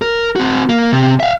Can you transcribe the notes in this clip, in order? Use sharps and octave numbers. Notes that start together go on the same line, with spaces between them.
A#4
C4 F#4
A#3
C3
E5 F5